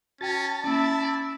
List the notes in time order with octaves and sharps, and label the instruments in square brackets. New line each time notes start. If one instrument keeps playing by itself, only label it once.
[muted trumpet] C#4 [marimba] F#4 G5 [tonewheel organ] A5 A6
[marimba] A#3 C#4 [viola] E4 E5 [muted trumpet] D5